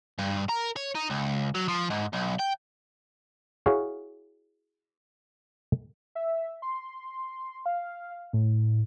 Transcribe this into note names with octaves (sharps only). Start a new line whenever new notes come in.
G2
A#4
C#5
D#4
C#2
F#3
F3
G#2
B1
G5
E4 F#4 G#4 C#5 F5
E5
C6
F5
A2